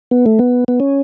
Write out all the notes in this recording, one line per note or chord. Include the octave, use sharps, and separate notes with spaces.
B3
A3
B3
B3
C#4